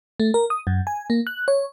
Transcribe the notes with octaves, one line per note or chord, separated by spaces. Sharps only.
A3
A#4
D#6
F#2
G#5
A#3
F#6
C#5